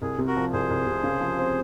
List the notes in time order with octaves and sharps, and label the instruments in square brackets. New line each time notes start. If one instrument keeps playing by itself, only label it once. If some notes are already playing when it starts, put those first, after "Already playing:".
[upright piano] C2 [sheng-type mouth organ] G#4
[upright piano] C3
[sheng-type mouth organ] F#4 A#4
[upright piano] F3
[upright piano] C2 [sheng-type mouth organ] G#4 C5
[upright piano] C2
C3
C#3
F3
C4